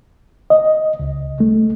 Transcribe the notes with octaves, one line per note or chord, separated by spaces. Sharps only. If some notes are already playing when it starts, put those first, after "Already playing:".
D#5
C#2
A3